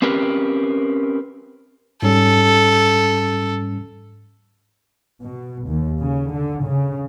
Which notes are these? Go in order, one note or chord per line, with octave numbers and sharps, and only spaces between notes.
C4 C#4 G4 A#4 B4
G#2 G3 C#4 A4
B2
D#2
C#3
D3
C#3